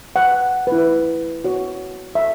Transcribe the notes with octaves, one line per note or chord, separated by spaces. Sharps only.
F#5
E4 B4
F#4 C#5
E5